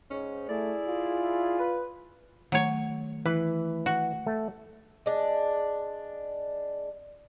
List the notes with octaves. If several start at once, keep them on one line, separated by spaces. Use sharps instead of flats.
G#2 C#4
A3 E4 G#4 D5
F4
B4
D#3 F#3 A3 C#5
E3 B4
F#4
A3
G#3 D4